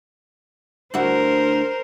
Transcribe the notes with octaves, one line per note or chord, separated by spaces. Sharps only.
D2 E4 F#4 A#4 C5